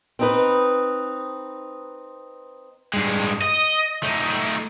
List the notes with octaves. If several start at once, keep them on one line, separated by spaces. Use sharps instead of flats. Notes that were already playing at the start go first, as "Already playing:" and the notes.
C4 D#4 B4
G2 G#3
D#5
A3 D#4